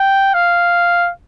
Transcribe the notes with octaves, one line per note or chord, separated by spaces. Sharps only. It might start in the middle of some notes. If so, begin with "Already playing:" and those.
Already playing: G5
F5